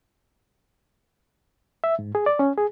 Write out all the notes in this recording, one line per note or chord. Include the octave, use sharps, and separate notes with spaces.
E5
G#2
G#4
D5
C#4
G#4